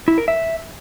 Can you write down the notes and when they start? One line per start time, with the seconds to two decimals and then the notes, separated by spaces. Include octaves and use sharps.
0.08 E4
0.18 A#4
0.28 E5